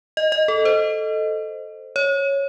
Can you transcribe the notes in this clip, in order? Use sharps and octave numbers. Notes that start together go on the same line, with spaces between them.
D#5
D#5
A4
C5
C#5